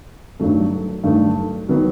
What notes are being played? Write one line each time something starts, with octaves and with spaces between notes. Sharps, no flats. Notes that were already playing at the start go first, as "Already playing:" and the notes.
G2 D#3 F#3 A3
G2 D#3 F#3 A3
D#3 F#3 B3